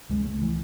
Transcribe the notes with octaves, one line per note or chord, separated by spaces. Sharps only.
C#2 C#3 G#3
A3
E3